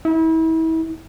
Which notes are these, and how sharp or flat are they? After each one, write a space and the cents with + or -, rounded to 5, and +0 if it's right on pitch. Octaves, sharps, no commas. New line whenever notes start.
E4 -35